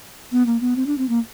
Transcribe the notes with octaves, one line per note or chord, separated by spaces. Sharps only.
B3
A#3
B3
C4
D4
C4
A#3